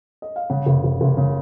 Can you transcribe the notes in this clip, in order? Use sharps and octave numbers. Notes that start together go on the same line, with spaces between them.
D#5
F5
C#3 F#5
F#1
F#1
F#1
C#3